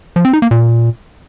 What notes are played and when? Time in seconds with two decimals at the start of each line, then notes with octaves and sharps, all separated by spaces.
0.16 F3
0.25 C4
0.33 D#4
0.42 A#3
0.51 A#2